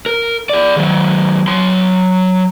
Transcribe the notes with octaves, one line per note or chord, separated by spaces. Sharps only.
A#4
G#4 D5
D#3 F#3
F#3 C6